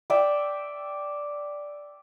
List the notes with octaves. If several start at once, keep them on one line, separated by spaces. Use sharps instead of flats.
D5 E5 G5